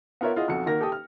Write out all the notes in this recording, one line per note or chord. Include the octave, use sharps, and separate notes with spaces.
B3 F4 A#4 C#5 E5
E4 F4 G#4 D#5 F#5
B1 F2 F#4 C#7
D#3 A#3 F#4 A#4 A#6
G4 A4 G5 D#6
F6